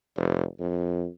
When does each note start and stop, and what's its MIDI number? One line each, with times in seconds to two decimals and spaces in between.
0.17 0.44 29
0.60 1.07 41